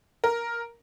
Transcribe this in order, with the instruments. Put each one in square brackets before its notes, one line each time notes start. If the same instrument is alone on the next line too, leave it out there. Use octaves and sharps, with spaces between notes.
[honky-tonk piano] A#4